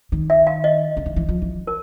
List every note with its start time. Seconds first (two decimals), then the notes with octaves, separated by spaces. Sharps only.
0.12 D#3
0.30 E5
0.47 F5
0.64 D#5
0.97 D3
1.06 D#3
1.16 E3
1.29 F3
1.42 E3
1.67 A#4